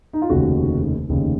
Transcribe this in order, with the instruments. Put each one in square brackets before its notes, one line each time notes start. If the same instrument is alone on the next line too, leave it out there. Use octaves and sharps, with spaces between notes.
[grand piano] D#4
F4
F1 D#2 C#3 F#4
F1 D#2 C#3